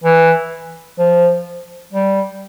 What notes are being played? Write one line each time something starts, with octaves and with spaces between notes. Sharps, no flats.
E3
F3
G3